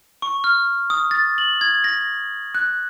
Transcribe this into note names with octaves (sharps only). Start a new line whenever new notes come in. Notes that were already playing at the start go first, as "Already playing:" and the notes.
C#6
F6
D#6
A6
F#7
G#6
A#6
F#6